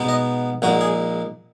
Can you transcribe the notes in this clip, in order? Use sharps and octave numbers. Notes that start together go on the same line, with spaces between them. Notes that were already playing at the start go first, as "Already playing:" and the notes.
Already playing: B2 G#3 B3 D#4
D#5
A#1 A#2 G#3 D#4 F#4
G#4